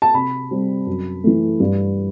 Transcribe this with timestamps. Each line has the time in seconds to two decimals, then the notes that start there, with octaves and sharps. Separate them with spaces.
0.02 A5
0.14 C3 B5
0.51 G3 C4
0.87 F#2
1.24 E3 A3
1.60 G2